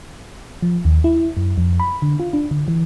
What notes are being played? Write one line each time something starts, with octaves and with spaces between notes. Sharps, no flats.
F3
D#2
E4
F#2
F2
B5
D3
F4
D4
D3
E3